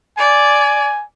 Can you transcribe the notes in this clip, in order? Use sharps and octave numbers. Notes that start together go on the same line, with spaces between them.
D5 G#5